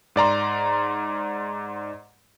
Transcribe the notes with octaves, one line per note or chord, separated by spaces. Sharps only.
G#2 D5 A#5 C6